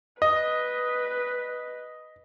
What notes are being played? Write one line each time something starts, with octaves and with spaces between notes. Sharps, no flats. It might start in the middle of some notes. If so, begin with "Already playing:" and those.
B4 D#5